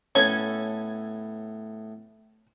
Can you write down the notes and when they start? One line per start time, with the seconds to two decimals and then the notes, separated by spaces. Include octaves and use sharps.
0.15 A2 B3 C#4 A4 G#6